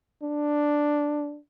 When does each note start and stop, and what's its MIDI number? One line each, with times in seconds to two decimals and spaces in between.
0.23 1.37 62